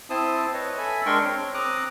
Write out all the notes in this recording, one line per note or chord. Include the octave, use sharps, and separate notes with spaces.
C4 E4 C5 A5 D#6
B4 C#5 D#5
A4 E5 G#5 B5
G#3 D4 A#4 G5 C6 C#6
C4 C#5
C4 A#5 D6 D#6 F#6